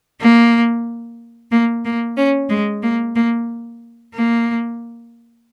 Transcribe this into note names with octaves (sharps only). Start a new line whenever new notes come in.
A#3
A#3
A#3
C#4
G#3
A#3
A#3
A#3